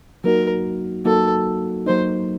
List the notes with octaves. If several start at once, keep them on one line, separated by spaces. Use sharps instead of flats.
F#3 A#3 D#4 F#4 A#4
F#3 A#3 D#4 F#4 A4
F#3 A#3 D#4 C5